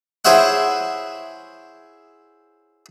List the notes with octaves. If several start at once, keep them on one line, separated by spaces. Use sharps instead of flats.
E4 G#4 C5 C#5 E5 F#5